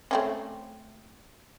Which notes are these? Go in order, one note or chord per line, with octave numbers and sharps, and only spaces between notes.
A3 C4 C#4